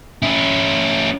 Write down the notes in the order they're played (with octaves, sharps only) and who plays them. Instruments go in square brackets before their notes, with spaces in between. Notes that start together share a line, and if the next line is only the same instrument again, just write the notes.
[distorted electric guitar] C#4 E4